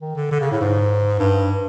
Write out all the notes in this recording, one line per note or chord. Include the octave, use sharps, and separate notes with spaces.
D#3
D3
D3
C#3
A2
G#2
G2